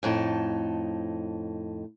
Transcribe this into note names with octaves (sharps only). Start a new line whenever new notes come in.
F2 A2 D#4 A5